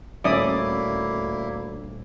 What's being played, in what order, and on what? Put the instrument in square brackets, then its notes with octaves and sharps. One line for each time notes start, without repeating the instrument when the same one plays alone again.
[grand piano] D#1 C#4 [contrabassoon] D2 [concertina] A#3 E4 [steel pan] D5 E5 D#6